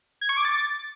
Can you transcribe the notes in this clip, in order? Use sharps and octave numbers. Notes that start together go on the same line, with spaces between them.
G#6
C#6
D6
A6